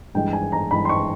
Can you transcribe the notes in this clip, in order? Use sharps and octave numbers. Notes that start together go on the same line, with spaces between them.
G2 E3 G#3 G5
G#5
A#5
G2 E3 G#3 B5
C6
C#6